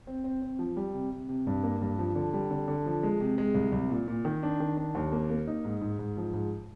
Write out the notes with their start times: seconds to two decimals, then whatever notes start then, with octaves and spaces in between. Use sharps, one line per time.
0.07 C4
0.24 C4
0.42 C4
0.59 F3
0.77 G3
0.94 C3
1.11 C3
1.29 C3
1.47 G2
1.64 A#3
1.81 G2
1.99 F3
2.15 D3
2.33 G3
2.51 D3
2.68 D3
2.86 F3
3.03 G#3
3.20 C3
3.38 G#3
3.55 C2
3.72 C2
3.90 A#2
4.08 A#2
4.25 D#3
4.43 D4
4.60 D#3
4.77 D4
4.95 D#2
5.12 A#3
5.30 A#3
5.47 D#4
5.65 G#2
5.81 G#2
5.99 G#2
6.17 F3
6.34 G#2